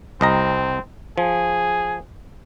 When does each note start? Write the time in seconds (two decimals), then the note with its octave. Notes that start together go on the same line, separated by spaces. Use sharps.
0.21 C2 C4 D#5 A#5
1.18 F3 G#4